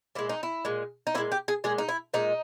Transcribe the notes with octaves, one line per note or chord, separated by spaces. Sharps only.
A#2 G#3 E4
D#4
E4
A#2 G#3
D#4
A#2 G#3 E4
G4
G#4
A#2 G#3 G#4
D#4
E4
A#2 G#3 D#4